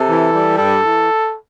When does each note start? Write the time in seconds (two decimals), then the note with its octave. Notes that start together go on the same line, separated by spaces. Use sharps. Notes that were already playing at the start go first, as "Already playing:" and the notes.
Already playing: C3 A4
0.08 E3
0.33 G3
0.58 G2 A4
0.83 E3